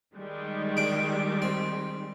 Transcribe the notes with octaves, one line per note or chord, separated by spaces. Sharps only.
D#3 G3 G#3
D4 D6
C4